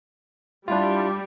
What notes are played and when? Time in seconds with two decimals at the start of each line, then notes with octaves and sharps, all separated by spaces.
0.68 G3 D4 E4 F4